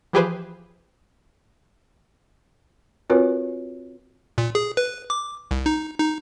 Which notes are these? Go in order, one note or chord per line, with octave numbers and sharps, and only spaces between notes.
E3 F3 G4 G#4 B4 C5
C4 F4 F#4 A#4 B4 C#5
A#2
G#4
B4
D6
C2
D#4
D#4